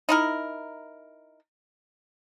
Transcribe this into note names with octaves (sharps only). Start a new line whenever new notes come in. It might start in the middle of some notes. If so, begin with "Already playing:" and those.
D#4 E4 A#4